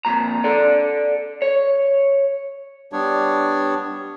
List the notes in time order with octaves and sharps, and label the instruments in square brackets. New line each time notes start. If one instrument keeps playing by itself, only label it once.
[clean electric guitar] F2 A#2 A#5
A4 D5
C#5
[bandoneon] G3 B3 D4 C#5